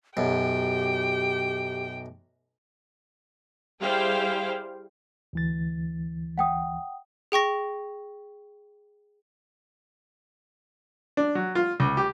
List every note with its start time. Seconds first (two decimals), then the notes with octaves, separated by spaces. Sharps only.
0.17 B1 F#2 G4 G5
3.81 G3 E4 G#4 C5 F5 G5
5.33 D2 E3 A6
6.38 F#5 G5 D#6
7.32 G#4 G5 C#6 A#6
11.17 D4
11.35 F#3
11.55 F4
11.80 C#2
11.97 G4